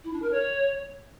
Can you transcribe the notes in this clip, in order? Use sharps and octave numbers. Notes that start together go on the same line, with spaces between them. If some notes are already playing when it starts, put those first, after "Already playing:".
E4
D4
A#4
C#5